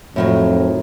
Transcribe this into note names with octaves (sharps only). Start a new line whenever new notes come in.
F2 A2 D#3 F#3